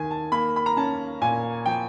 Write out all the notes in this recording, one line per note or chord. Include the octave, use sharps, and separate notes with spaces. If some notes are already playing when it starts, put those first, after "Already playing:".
Already playing: D#2 D#3 G#5
A5
A#3 B5
B5
A#5
C#4 A5
A#2 G#5
F3 G5